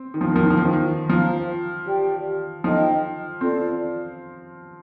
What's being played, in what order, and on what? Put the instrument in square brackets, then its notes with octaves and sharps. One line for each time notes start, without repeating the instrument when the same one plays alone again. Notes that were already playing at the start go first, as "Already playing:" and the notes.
Already playing: [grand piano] C4
D#3
F3
D#3
[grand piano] F3 [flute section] D4 F4 A#4
[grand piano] D#3
F3
D#3
F3
D#3
[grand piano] F3 [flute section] F4 C5 F5 A#5
[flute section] G4 D5 G5
[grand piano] F3 [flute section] D#4 A4 D#5 G5
[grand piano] C4 [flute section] F4 A4 D5